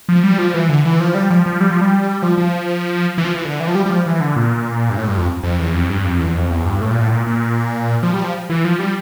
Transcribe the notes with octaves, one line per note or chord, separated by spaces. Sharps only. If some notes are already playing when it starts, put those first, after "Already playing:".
F3
G3
F3
E3
D3
E3
F3
G3
F3
F3
G3
F3
G3
F3
F3
E3
F3
E3
D3
E3
F3
G3
G3
F3
E3
D3
A#2
G2
A2
G2
F2
F2
E2
F2
G2
F2
E2
F2
E2
G2
A2
A#2
A2
A#2
A#2
F3
G3
F3
E3
F3
G3